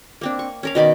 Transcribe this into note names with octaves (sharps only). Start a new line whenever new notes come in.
A#3 C4 D4
C#6
C#4 A#4 F5
B2 D#3 D5 B5